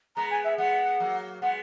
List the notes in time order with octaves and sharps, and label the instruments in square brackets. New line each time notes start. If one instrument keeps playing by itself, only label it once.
[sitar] G#3 B3 [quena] A#5
[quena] G#5
E5
[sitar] G#3 B3 [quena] F#5
[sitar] F#3 A#3
[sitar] G#3 B3 [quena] F#5